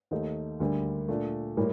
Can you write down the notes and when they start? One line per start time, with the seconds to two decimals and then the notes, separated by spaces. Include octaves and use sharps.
0.11 D#2 D#3 A3 D#4
0.60 D2 D3 G3 A#3
1.09 A#2 A3 D4
1.57 A2 G3 A#3